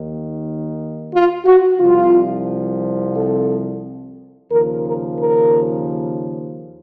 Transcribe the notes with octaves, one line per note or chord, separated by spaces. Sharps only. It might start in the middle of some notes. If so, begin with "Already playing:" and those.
Already playing: D#2 D#3
F4
F#4
C2 C3 F3 F4
A4
D#2 C#3 F3 A#4
A#4
A#4